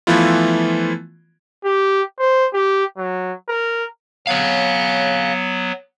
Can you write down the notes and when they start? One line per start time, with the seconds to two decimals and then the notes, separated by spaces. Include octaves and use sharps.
0.07 E3 F3 A3 B3 E4 F4
1.65 G4
2.19 C5
2.54 G4
2.98 F#3
3.49 A#4
4.27 F#3 B3 C#5 F5